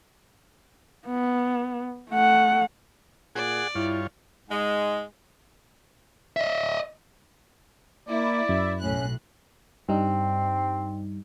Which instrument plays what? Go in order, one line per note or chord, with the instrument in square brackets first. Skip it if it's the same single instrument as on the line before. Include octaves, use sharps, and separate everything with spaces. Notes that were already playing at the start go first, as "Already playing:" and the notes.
[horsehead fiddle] B3
A3 F#5
[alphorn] A#2 [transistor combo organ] G#4 F#5 [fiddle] D5
[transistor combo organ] G2 F4 C#5 [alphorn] E4
[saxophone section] G#2 G#3
[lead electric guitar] D#5 E5
[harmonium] A#3 [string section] E4 [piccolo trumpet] D5
[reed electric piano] F#2 [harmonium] E5
[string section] B1 A2 F#6 [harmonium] C#4
[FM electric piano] G2 G3 D#4 [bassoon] C4